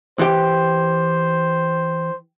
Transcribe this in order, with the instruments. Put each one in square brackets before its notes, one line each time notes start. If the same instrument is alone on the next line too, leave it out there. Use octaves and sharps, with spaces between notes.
[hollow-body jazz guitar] E3 G4 [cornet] C5